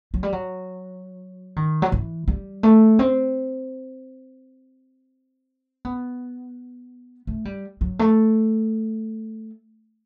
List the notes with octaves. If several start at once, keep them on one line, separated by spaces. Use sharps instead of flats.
F#3
G3
F#3
D#3
F#3
E3
G3
A3
C4
B3
A3
G3
F#3
A3